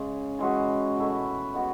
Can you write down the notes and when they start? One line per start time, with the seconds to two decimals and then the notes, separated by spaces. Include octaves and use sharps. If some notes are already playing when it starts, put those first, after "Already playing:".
Already playing: C#3 G#3 C#4
0.39 E3 G#3 C#4 F#4
0.96 B2 A3 E4
1.54 B2 G#3 B3 F#4